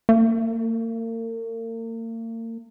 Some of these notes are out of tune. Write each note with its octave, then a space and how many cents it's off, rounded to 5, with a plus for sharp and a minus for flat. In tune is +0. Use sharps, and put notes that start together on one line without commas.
A#3 -40